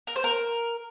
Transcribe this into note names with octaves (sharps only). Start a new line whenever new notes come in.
A#4
C5
A#4